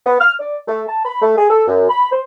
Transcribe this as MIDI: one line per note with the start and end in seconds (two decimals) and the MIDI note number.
0.05 0.15 59
0.20 0.32 89
0.39 0.56 74
0.68 0.82 57
0.88 1.03 81
1.05 1.19 83
1.22 1.37 57
1.37 1.45 68
1.50 1.65 69
1.67 1.87 42
1.89 2.08 83
2.10 2.20 72